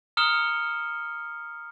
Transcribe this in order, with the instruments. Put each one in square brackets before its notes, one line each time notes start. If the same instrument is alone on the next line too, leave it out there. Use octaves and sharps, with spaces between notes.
[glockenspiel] A#5 D#6 F6 C#7 E7 G7